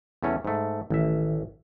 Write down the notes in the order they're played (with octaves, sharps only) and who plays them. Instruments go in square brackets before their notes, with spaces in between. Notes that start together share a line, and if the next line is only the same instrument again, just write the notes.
[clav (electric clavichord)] E2 A3 C#4
G#2 A3
[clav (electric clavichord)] A1 E5 [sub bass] D#3